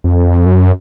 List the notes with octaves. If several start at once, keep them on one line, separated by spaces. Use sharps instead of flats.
F2
F#2